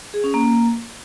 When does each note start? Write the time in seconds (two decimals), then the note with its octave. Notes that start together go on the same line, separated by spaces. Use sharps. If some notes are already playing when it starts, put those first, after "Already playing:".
0.14 G#4
0.24 C#4
0.34 A#3